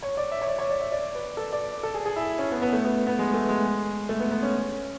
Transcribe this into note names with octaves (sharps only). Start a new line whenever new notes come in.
C#5
D5
E5
C#5
D5
C#5
D5
E5
D5
B4
A4
D5
A4
G#4
G#4
E4
C#4
B3
B3
A3
B3
B3
G#3
A3
G#3
A3
B3
B3
C#4